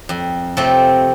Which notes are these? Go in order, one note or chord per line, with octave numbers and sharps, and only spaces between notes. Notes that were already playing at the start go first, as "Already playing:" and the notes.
F2
C3 F3 A3 C4